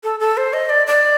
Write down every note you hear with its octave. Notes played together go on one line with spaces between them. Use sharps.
A4
A4
C5
D#5
D5
D5